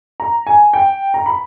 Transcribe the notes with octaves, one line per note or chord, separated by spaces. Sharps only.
A#5
G#5
G5
A#5
B5